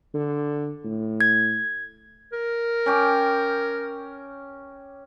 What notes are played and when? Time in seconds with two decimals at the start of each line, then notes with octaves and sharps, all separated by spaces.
0.14 D3
0.84 A2
1.21 G#6
2.32 A#4
2.86 C#4 G5 D6